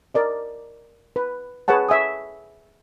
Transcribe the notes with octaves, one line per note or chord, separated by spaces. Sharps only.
A#4 D5 D#5
B4
G#4 B4 C#5 F#5 A5
C#5 E5 G#5 D#6